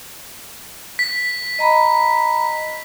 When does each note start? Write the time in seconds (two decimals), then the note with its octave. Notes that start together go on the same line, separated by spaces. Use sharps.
0.99 B6
1.59 D#5 A#5 B5